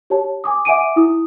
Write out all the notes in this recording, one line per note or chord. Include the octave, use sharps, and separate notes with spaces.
G4 C#5 A5
G#5 D6 D#6
E5 F#5 G#5 D6 D7 D#7
E4 D#6